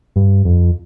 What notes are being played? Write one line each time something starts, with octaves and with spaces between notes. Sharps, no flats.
G2
F2